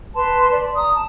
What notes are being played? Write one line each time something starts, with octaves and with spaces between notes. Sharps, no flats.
B4 A5 C6
D5
A#5 D#6
A5